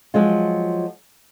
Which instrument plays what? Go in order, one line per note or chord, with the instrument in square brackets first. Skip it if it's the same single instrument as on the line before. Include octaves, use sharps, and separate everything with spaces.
[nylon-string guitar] F3 F#3 G#3 F4